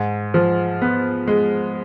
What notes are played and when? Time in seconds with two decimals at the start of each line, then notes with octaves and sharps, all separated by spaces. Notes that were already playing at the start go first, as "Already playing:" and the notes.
Already playing: G#2
0.34 F3
0.81 B3
1.28 G#3